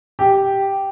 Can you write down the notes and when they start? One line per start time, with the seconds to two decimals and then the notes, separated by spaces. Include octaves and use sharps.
0.19 G4